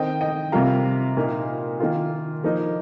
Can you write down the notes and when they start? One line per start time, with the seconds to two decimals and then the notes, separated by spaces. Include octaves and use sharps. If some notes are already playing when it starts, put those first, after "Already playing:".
Already playing: D#3 C4 D#4 D#5 G5
0.21 D#5 G5
0.52 C3 G3 A#3 F4 F5 A#5
1.17 A#2 A#3 D#4
1.80 D#3 A#3 F4
2.44 F3 A#3 D#4